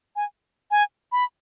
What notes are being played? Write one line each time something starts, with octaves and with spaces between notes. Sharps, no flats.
G#5
G#5
B5